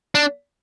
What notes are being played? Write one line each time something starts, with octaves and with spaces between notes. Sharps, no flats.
D4